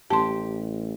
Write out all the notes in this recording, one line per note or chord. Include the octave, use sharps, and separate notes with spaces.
A1 G4 A5 C6